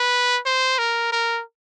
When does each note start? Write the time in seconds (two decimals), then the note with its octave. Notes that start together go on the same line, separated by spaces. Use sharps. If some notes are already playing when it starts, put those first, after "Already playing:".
Already playing: B4
0.46 C5
0.79 A#4
1.12 A#4